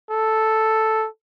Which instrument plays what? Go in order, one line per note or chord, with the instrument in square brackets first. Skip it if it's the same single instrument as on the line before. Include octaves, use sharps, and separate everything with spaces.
[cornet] A4